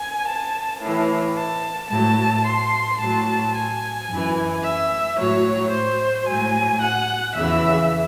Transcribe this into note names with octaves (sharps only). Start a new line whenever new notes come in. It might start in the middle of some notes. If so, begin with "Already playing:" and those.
Already playing: G#5
A5
A2 E3
A5
A2 F#3 A5
C6
A2 F#3 A5
G#5
F#2 E3
E5
A2 F#3 C#5
C5
A2 F#3 G#5
F#5
E2 C#3 E3 E5